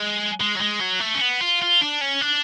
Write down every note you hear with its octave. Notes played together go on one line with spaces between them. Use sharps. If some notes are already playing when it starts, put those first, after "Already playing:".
Already playing: G#3
G#3
F#3
G#3
F#3
A3
C#4
B3
F4
F4
D4
C#4
D4